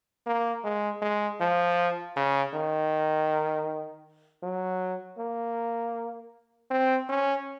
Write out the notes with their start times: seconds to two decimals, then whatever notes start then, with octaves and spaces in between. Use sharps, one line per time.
0.27 A#3
0.64 G#3
1.02 G#3
1.40 F3
2.16 C#3
2.54 D#3
4.43 F#3
5.19 A#3
6.71 C4
7.09 C#4